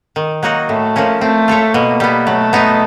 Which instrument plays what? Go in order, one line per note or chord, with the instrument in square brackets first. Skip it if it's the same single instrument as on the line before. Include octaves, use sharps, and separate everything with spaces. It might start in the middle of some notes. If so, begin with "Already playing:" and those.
[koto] D#3
F#3 A#3 D#4 F#4
[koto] A2 [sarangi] A3
[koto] F3 A#3 C#4
[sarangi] A3 [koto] C4
[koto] F4 A4 C#5 E5
[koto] B2 [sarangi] A#3
[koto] G3 B3
[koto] F#3 [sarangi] A3
[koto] B3 D#4